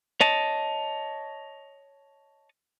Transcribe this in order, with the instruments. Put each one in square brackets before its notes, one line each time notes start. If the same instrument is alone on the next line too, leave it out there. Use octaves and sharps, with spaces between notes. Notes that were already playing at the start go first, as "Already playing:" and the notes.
[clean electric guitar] C#5 D#5 A5